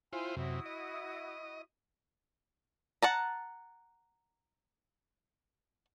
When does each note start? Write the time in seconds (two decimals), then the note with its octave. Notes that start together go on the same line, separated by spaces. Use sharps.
0.13 E4 F4 C5 G5 G#5 C6
0.37 F#2 C3 E4 F#4 D#6
0.66 D#5
3.02 F#5 A5 A#5